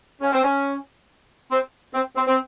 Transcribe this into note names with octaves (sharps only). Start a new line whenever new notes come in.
C#4
C4
C#4
C4
C4
C4
C4